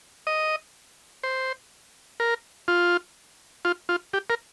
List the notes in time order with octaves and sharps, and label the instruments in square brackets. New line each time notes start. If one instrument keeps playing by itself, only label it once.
[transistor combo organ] D#5
C5
A#4
F4
F4
F4
G4
A#4